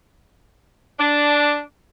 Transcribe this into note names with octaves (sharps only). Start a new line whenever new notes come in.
D4